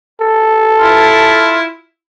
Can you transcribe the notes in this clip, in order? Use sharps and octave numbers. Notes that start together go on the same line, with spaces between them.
A4
E4 F4